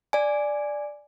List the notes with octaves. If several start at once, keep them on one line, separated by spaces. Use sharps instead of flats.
D5 G#5